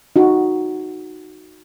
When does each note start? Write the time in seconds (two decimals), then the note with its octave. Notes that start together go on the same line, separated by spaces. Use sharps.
0.16 D#4 F#4